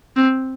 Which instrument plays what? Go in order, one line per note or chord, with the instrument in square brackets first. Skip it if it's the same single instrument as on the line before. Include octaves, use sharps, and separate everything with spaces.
[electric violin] C4